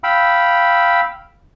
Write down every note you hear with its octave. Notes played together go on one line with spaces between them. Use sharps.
F5 G5 B5 E6